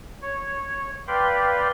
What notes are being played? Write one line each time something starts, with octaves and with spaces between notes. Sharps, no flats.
C#5
B4 D5 F5 G5 B5 C6